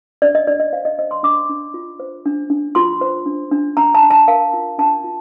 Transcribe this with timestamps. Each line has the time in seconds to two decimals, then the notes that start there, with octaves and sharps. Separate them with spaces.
0.22 D4 D5
0.35 D#5
0.47 D4 D5
0.60 D#5
0.73 C5 F5
0.85 D#5
0.99 C5 D#5
1.11 C6
1.23 D4 D6
1.49 D4
1.74 F4
2.00 C5
2.25 D4
2.50 D4
2.75 F4 C6
3.01 C5
3.26 D4
3.52 D4
3.77 D4 A#5
3.95 A5
4.03 D4
4.10 A5
4.28 A#4 F5
4.53 F4
4.78 D4 A5
5.04 F4